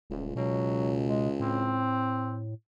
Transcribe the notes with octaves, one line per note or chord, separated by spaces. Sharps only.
D#1 C#2
C#2 B2 F#3
G#3
A2 C4